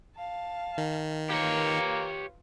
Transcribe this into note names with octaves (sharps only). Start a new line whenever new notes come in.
F5 A5
D#3
A#3 F4 G4 B4 C#5